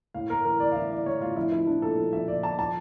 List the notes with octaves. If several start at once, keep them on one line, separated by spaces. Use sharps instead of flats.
A2 F5
A2 A#4
E3 A#4
A2 D5
F5
E3 E5
E3 D5
A2 C#5
A2 F4
F3 E4
F3 E4
F3 D4
A#2 A4
F3
F3 E5
A#2 D5
A#2 A5
F3 A5